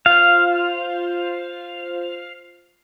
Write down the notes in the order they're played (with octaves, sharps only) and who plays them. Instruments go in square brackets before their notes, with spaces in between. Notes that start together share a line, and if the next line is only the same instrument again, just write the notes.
[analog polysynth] F4 C5 [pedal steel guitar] F5